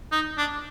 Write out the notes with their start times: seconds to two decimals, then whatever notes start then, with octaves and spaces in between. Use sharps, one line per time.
0.12 D#4
0.38 D4